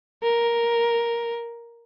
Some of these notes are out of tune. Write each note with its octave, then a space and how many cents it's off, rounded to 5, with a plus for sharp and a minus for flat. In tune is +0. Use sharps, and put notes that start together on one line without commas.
A#4 +5